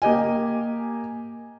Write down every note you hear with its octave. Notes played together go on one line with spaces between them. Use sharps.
A#3 G4 D#5 G#5